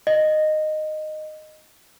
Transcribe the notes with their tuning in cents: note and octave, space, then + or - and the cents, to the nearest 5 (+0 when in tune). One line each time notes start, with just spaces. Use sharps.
D#5 -10